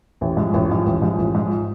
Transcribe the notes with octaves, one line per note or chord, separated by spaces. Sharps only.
A1
G#2 F3
A1
G#2 F3
A1
G#2 F3
A1
G#2 F3